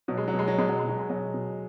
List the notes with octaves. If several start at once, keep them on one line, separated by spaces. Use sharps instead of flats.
B2 F#3
G#3
F#3
B2
G#3
F#3
B2 G#3
F#3
B2 G#3
F#3
G#3
B2 F#3
B2